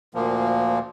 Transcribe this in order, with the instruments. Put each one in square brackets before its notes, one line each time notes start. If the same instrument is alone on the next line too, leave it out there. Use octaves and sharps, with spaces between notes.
[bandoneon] D2 A#2 F3 A#3